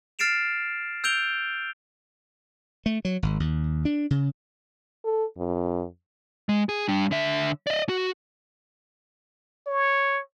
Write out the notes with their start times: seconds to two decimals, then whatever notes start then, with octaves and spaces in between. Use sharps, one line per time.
0.19 F6 A6 C7 D7 E7 F7
1.04 E6 G6 D7 F7 G7
2.86 A3
3.05 F#3
3.23 G#1
3.40 D#2
3.85 D4
4.11 C#3
5.04 A4
5.38 F2
6.49 G#3
6.69 G#4
6.88 G3 D4
7.11 D3 E5
7.67 D5 D#5
7.89 F#4
9.67 C#5